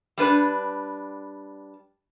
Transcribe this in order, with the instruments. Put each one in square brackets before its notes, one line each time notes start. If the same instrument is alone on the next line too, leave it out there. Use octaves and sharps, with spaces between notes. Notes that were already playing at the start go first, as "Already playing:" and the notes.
[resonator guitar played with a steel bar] G3 D4 B4